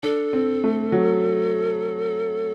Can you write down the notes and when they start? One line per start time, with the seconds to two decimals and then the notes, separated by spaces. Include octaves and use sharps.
0.03 D4 A4
0.33 C4
0.64 A3
0.92 F#3